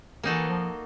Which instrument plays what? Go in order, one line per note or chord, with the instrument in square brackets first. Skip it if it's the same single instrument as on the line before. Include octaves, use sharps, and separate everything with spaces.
[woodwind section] E3 [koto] A#3 D#4 F#4 A4
[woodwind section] F3